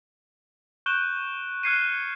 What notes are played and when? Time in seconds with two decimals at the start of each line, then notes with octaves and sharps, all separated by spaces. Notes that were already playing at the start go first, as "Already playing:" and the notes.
0.86 C#6 F#6 G6 D7 E7 G7
1.63 F6 F#6 G#6 C7 C#7 D#7